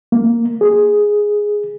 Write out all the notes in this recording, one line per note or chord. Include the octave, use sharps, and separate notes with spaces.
A#3
G#4